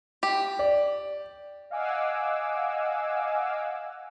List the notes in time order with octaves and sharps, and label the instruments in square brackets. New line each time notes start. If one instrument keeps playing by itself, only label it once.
[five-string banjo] G4
[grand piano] D5
[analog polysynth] D#5 F5 F#5 G#5 D6 E6